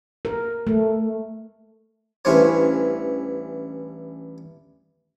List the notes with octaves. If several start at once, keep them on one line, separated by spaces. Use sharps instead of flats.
A#4
A3
A1 G2 E3 C#4 C5 C#5